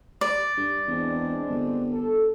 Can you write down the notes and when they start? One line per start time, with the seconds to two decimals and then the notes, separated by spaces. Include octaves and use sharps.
0.21 D5
0.57 G2
0.88 E2 G#3 C4 D4
1.49 G1
1.91 A4